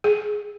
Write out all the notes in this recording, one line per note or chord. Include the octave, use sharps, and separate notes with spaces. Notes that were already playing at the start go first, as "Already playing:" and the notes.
G#4